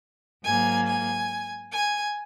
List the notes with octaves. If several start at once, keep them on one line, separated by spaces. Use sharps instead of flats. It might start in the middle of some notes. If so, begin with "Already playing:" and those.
G#2 F#3 A#3 G#5
G#5
G#5